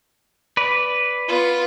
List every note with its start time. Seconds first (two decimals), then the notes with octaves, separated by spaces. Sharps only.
0.57 B4 D5
1.28 B3 F4